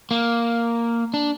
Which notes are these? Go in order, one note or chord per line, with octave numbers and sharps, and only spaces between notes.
A#3
D4